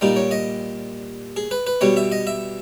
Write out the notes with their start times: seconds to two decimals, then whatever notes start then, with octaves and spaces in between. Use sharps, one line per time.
0.01 A#2 G3 D#4
0.16 C#5
0.31 D#5
1.37 G#4
1.51 B4
1.67 B4
1.81 B2 G3 C#5
1.97 E5
2.12 D#5
2.27 E5